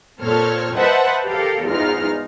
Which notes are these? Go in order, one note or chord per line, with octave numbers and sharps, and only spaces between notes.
A#2 C4 A4 C#5 F6
B4 C5 D#5 E5 F#5 A5
G4 A4 A#4 F5
E2 G#2 D#4 F4 F6